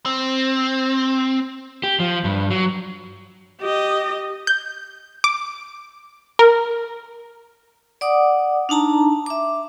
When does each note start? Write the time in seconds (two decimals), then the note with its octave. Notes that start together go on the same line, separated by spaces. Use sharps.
0.06 C4
1.84 G4
2.00 F3
2.24 G2
2.51 F#3
3.61 G4 D#5
4.47 G6
5.24 D6
6.39 A#4
8.01 D5 F#5 D6 D#6
8.69 D4 D#4 A5 A#5
9.26 E5 D6